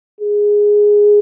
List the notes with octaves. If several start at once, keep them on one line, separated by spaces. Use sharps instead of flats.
G#4